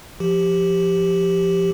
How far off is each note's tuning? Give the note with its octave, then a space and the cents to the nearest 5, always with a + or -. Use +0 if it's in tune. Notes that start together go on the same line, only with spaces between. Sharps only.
F3 -10 G4 +0